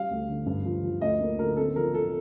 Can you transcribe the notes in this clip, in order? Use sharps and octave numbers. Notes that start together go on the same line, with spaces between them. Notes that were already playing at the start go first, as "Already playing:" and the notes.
Already playing: G3 F5
D2
D3
G2
F3
F3
D2 D#5
A#3
D3 A#4
C4 A4
F3 A#4
F3 A4